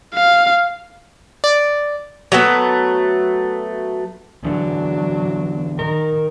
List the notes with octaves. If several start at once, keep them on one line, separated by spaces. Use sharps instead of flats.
F5
D5
F#3 A3 B3
E2 D3 F#3 D4
D#3 A#4